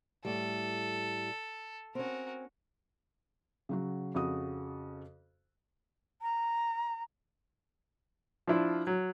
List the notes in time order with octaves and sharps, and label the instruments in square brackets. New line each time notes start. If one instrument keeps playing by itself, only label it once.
[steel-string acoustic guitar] A2 G3 [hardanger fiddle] A4
[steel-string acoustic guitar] C4 C#4 [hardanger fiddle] F#4 A#4
[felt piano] C#3 F#3 F#4
F2 C#3 F#4 D#6
[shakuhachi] A#5
[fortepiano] F3 D4 E4 F4
F#3